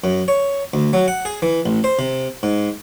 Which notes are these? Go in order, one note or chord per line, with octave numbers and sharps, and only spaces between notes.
F#2
C#5
D2
F#3
F#5
G#4
E3
A1
C5
C3
G#2